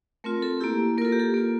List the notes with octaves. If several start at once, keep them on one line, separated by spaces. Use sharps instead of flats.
A3 C4 F4 A#4
A4
A#3 E4 G4
A#3 F4 A4 A#4
G4
A4
A#3 F4